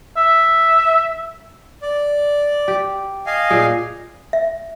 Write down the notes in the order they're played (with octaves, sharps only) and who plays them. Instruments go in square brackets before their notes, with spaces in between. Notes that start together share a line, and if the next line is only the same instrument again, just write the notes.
[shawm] E5
[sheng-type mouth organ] D5
[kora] G4
[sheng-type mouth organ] D#5 F5 G#5
[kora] A#2 G#4
[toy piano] E5